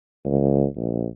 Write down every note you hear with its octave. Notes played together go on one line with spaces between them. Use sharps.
C#2
A#1